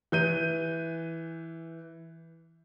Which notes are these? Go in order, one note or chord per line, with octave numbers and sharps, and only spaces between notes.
E3 G6 D#7